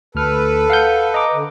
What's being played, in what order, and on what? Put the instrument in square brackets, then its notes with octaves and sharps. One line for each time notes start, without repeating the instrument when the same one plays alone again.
[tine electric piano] D2 F6 [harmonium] A4 B4
[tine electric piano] F5 F#5 G6
D#5 A#5 D6
[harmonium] D3